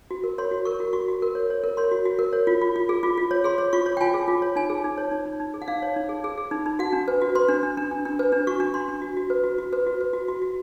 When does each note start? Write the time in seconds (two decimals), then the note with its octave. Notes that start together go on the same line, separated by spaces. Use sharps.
0.11 F#4
0.24 A#4
0.38 C#5 C6
0.51 F#4
0.65 A#4 C#6
0.80 F#4
0.93 F#4 C#6
1.08 F#4
1.22 A#4
1.35 C#5
1.50 C#5
1.64 A#4
1.77 C#5 C6
1.91 F#4
2.05 F#4
2.19 A#4
2.33 C#5
2.47 F4
2.61 F4
2.76 F4
2.89 G#4
3.03 F4
3.18 F4
3.31 C#5
3.44 G#4 C6
3.58 C#5
3.73 F4 C#6
3.86 C#5
3.97 G5
4.01 F4 G#5
4.14 G#4
4.28 F4
4.42 C#5
4.56 D#4 G#5
4.70 G#4
4.84 D#4
4.98 C#5
5.11 D#4
5.25 D#4
5.40 D#4
5.54 G#4
5.62 F#5
5.68 D#4 F5
5.82 C#5
5.96 D#4
6.09 G#4
6.24 G#4
6.37 G#4
6.51 D#4
6.66 D#4
6.79 F#4 F#5
6.93 D4
7.08 B4
7.21 F#4
7.35 B4 C6
7.48 D4
7.63 D4
7.77 D4
7.91 D4
8.05 D4
8.19 B4
8.32 D4
8.47 F#4 C#6
8.60 D4
8.74 D4 C6
8.88 D4
9.02 F#4
9.17 F#4
9.30 B4
9.44 F#4
9.58 F#4
9.73 B4
9.87 F#4
10.01 B4
10.13 F#4
10.28 F#4
10.42 F#4